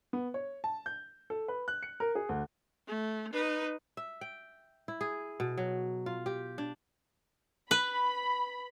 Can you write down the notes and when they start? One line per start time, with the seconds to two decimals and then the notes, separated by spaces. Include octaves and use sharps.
0.13 B3
0.34 C#5
0.64 A5
0.86 G6
1.30 A4
1.48 B4
1.68 F#6
1.83 C#7
2.00 A#4
2.15 G#4
2.29 D2
2.87 A3
3.33 D#4 B4
3.97 E5
4.21 G5
4.88 E4
5.01 G#4
5.40 B2
5.58 F#3
6.06 F4
6.26 G4
6.58 D4
7.71 B4 B5